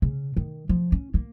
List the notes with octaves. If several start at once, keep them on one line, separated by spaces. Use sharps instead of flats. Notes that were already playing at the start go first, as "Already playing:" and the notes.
C#3
D#3
F3
C#4
A#3